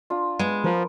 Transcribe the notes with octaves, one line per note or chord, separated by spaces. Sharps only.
D4 F4
G#3 B3
F3 A#4